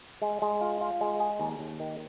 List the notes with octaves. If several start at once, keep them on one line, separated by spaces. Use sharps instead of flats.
G#3
G#3
F4
F4
G#3
G#4
D#2
D#2
D#3